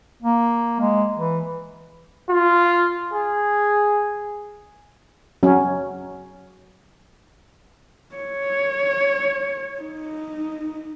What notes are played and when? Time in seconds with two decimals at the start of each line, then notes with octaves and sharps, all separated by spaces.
0.22 A#3
0.80 G#3
1.17 E3
2.30 F4
3.14 G#4
5.43 F#3 C#4
8.16 C#5
9.81 D#4